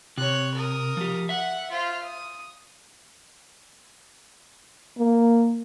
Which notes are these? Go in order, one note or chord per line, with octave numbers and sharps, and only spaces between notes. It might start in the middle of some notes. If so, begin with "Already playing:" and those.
C3 C#5 F#6
A#4 D#6
F3 G4
E5 F#5
F4 C5
D#6
A#3